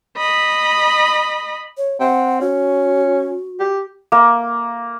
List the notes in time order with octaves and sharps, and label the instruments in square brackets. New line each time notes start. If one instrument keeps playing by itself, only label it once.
[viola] D#5 B5
[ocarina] C#5
[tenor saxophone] C4 [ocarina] F#5
[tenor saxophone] C#4 [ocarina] F#4
[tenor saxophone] G4
[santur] A#3